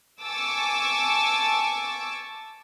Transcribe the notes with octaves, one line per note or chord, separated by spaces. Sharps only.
G#5 A5 C#6 D6 E6